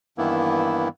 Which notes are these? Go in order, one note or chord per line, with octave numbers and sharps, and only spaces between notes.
G2 D#3 E3 A#3 B3 E4